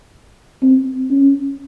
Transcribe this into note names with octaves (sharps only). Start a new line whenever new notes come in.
C4
C#4